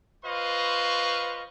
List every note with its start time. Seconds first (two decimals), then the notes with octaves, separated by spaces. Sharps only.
0.24 F4 B4 C5 D#5 F5 C#6